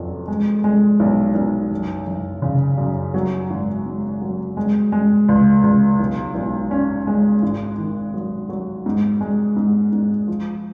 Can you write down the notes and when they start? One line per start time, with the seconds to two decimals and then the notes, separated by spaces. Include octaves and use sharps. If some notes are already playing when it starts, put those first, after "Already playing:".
Already playing: F1 F2 F#3
0.28 G#3
0.64 G#3
1.00 B1
1.35 B1
1.71 F#1
2.07 F#1
2.42 C#3
2.78 F#2
3.14 F#3
3.50 G#1
3.86 G#2
4.21 F#3
4.57 G#3
4.92 G#3
5.29 C#2
5.64 C#2
5.99 B1
6.35 B1
6.71 C#4
7.07 G#3
7.42 G#1
7.78 D#3
8.14 F#3
8.49 F#3
8.86 G#2
9.21 G#3
9.56 G#2
9.92 G#2
10.28 F3